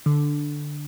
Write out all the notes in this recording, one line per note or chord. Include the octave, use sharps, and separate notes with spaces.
D3